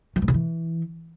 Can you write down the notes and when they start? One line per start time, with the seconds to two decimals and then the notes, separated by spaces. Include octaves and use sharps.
0.16 E3
0.22 G2
0.28 C#3
0.34 E3